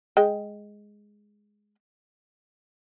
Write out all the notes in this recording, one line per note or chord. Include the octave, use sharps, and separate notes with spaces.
G#3 G5